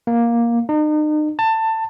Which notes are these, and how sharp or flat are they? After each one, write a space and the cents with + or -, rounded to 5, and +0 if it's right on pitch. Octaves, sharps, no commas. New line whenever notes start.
A#3 +10
D#4 -40
A5 +20